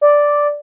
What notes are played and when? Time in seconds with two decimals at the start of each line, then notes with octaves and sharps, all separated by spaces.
0.01 D5